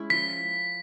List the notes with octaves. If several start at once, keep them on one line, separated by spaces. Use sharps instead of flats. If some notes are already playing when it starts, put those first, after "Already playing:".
Already playing: G#3 C#4 E4
F3 B6